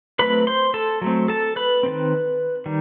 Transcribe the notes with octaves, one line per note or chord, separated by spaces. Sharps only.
F#3 A3 C4 B4 B5
C5 C6
A4 A5
F#3 A3 C4
A4 A5
B4 B5
D#3 G3 C4
D#3 G3